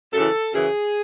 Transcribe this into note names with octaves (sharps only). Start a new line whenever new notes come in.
F#2 C#3 E3 A4
F#2 C#3 E3 G#4